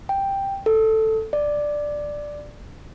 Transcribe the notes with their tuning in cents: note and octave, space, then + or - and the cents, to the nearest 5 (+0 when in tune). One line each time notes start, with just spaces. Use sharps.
G5 +5
A4 +5
D5 +5